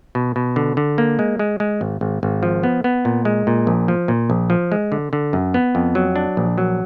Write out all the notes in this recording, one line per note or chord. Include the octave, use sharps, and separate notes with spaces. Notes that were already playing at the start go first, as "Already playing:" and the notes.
B2
B2
D3
D3
A#3
G#3
G#3
G#3
G#1
G#1
G#1
F3
B3
B3
A#2
G#3
A#2
A#1
F3
A#2
A#1
F3
G#3
D3
D3
F#2
B3
F2
F#3
D4
A#1
F#3